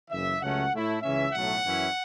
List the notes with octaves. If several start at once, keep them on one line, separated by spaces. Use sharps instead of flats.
F#1 F#2 C#3 E3 E5
C#2 C#3 F#3 A3 C#4 F#5
A2 A3 E4
C#2 C#3 E3 C#4 E5
B1 A2 F#3 A3 F#5
F#2 E3 C#4 E4